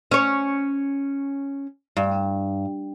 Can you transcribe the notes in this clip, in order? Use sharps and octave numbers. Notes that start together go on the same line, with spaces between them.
C#4 C#5
G2